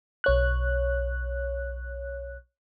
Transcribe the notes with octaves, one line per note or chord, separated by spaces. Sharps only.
B1 C#5 F#6